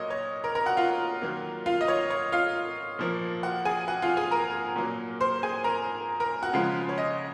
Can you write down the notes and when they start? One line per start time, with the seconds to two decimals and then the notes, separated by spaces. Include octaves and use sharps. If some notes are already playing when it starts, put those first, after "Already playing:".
Already playing: A#2 F#3 A#3 C#5 D#5
0.10 C#5
0.44 A#4 A#5
0.55 A#4 A#5
0.66 F#4 F#5
0.77 F4 F5
1.22 D#3 F#3 A#3
1.66 F4 F5
1.81 D#5
1.88 C#5
2.10 C#5
2.32 F4 F5
2.99 A#2 F3 A#3
3.43 F#4 F#5
3.65 G#4 G#5
3.88 F#4 F#5
4.02 F4 F5
4.17 G#4 G#5
4.31 A#4 A#5
4.76 A#2 F#3 A#3
5.20 C5 C6
5.43 G#4 G#5
5.64 A#4 A#5
6.20 A#4 A#5
6.43 F#4 F#5
6.53 C#3 F3 G#3 F4 F5
6.89 C#5
6.98 D#5